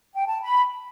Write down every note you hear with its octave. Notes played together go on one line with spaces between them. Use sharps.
G5
A5
B5